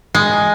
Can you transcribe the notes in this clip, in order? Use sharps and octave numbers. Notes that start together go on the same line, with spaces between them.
G#3